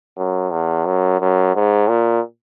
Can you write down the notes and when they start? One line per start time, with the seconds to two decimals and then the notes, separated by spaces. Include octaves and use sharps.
0.17 F#2
0.51 E2
0.86 F#2
1.20 F#2
1.55 G#2
1.89 A#2